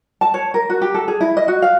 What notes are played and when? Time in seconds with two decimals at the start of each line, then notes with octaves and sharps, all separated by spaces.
0.21 A5
0.34 C#5
0.54 A#4
0.70 F#4
0.82 G4
0.95 A4
1.08 G#4
1.21 E4
1.37 D#5
1.48 F#4
1.62 F5